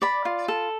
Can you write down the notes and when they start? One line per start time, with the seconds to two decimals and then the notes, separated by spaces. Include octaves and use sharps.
0.02 D5 B5
0.25 F4
0.48 A4